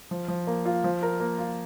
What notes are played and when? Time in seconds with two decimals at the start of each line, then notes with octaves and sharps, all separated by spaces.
0.11 F3
0.28 F3
0.47 A#3
0.65 F4
0.84 F3
1.03 A#4
1.20 A#3
1.39 F4